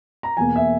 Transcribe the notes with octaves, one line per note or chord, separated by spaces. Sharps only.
A#5
E2 B2 A#3 G#5
E5